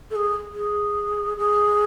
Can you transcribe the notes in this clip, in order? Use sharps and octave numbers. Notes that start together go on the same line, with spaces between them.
A4
G#4
G#4
G#4